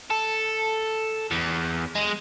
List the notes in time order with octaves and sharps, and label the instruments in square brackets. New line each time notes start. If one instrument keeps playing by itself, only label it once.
[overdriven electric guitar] A4
E2
G#3